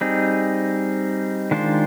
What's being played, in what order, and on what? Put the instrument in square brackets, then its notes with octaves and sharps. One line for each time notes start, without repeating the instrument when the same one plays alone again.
[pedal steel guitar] G3 C4 D#4 G#4
D#3 G#3 D4 F4 C5